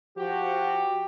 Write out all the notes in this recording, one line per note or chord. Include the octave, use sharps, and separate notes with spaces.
F3 F#4 G4